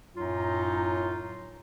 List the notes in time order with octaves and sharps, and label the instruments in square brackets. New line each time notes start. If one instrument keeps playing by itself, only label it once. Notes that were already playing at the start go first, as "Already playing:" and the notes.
[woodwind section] F#2 A2 F#3 D#4 F4